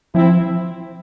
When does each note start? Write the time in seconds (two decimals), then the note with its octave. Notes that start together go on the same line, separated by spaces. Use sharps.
0.15 F3 C4 E4